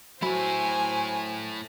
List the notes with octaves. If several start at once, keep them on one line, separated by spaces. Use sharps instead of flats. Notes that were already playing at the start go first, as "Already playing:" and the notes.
A2 F#3 E4 C5 G#5 B5